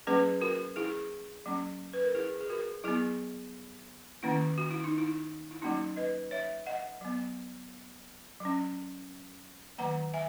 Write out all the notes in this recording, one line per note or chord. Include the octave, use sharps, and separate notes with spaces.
F#3 A#3 C#4 G#4 B4
F#4 A#4
E4 G#4
F#3 A#3 C#4
B4
A#4
E4 G#4
G#4
F#4 A#4
F#3 B3 E4 G#4
D#3 A#3 C#4 E4
F#4
E4
D#4
E4
E4
F#3 A#3 C#4 D#4 F#4
B4 D#5
C#5 E5
D#5 F#5
F#3 B3
F#3 C#4
D#3 F#3 A#3 F#5 A#5
E5 G#5